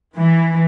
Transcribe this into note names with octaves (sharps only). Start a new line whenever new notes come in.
E3